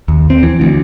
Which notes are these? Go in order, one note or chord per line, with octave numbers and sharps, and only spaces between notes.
D#2
C4
E3
D2